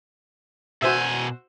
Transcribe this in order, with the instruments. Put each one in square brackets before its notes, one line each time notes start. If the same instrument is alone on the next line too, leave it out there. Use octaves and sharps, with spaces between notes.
[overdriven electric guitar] B2 G#5 [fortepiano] F#4 C5 E5